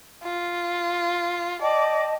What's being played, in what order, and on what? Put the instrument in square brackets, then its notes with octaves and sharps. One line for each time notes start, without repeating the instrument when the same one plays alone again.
[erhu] F4
[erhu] D5 [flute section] D#5 G5 A5